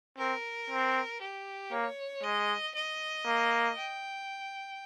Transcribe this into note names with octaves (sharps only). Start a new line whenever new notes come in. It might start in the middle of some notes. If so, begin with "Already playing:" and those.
C4 A#4
C4
G4
A#3 C#5
G#3 D#5
D#5
A#3
G5